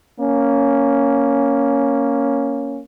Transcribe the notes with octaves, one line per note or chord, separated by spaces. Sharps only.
A#3 C#4